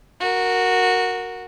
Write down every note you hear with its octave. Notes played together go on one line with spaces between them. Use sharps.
F#4 A#4